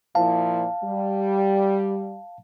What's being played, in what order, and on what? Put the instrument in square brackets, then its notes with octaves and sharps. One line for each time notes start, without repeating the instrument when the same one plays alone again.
[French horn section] A#2 F3 E4 [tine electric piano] F5 A5
[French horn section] G3